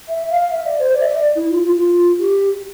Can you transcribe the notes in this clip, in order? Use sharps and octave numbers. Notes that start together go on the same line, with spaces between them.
E5
F5
E5
D5
C5
D5
E5
D5
E4
F4
F4
F4
G4